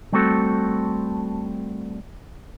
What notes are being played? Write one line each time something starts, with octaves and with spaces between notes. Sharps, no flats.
G3 A3 C4 F#4 A4